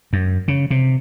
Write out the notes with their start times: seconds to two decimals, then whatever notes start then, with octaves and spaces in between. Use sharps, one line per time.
0.13 F#2
0.48 C#3
0.71 C3